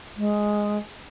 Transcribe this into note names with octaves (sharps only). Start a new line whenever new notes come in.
G#3